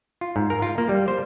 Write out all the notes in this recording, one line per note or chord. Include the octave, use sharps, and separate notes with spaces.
F4
G#2
A#4
F4
A#3
G3
C5